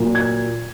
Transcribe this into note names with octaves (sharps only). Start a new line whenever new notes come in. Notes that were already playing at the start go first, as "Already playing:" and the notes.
Already playing: A#2 F#3 A#3
G#6